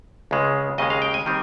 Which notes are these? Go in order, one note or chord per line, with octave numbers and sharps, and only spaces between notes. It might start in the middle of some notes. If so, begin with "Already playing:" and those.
C#2 C#3 G#3
D#2 C#3 G#3 D#5
F5
G5
G#5
D#3 G3 C4